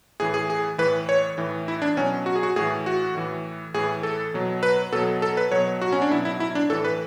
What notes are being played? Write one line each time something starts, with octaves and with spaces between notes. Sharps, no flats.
A2 E3 G#4
G#4
G#4
A2 E3 B4
C#5
A2 E3
E4
D4
B2 F#3 C#4
F#4
G#4
F#4
A2 E3 G#4
F#4
A2 E3
A2 E3 G#4
A4
B2 F#3
B4
B2 F#3 A4
A4
B4
B2 F#3 C#5
F#4
C#4
D4
B2 F#3 E4
E4
E4
D4
A2 E3 A4
B4